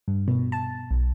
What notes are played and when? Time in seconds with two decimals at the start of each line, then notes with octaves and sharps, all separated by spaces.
0.08 G2
0.28 B2
0.52 A5
0.91 B1